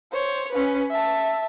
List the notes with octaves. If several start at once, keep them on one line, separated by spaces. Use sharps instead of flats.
C5 C#5
C#4 B4
E5 A5